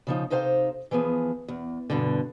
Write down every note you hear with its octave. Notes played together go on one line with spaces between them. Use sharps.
C#3 F3 D#4
C3 D#4 A4 C5 F5
E3 F3 B3 G#4
E2
E2 G2 B2 D3